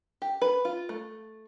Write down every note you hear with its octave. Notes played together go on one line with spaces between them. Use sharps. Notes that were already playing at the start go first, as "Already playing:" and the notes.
G4
B4
F4
A3